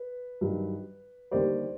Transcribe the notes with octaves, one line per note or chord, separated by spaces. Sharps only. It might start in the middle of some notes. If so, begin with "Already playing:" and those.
Already playing: B4
G2 D#3 F#3
D#2 D3 G3 C5 D5